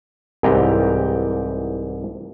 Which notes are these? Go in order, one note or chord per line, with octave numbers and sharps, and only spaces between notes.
C2 G#2 E3 G4 G5 A#5